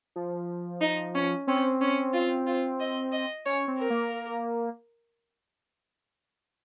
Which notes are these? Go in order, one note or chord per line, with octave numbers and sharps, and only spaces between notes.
F3
D#4
C#4
C4 C#4
C#4
F4
F4
D#5
D#5
C#4 C#5
C4
A#4
A#3